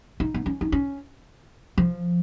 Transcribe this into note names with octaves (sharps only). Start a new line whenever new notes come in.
D#4
B3
C#4
D#4
C#4
F3